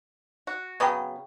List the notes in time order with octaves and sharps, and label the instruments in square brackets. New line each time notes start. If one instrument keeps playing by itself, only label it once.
[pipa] F#4
[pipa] C#3 F#3 B3 [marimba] G5 C#6